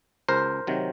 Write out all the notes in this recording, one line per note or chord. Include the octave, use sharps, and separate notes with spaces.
C#2 A#4 C5
C3 D#3 F#3